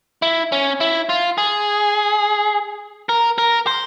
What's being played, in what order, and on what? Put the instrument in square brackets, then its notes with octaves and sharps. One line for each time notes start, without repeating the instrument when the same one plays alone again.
[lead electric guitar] E4
C#4
E4
F4
G#4
A#4
A#4
C5